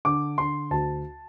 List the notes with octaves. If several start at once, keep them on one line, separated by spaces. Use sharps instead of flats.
D3 D6
D3 C6
D2 A5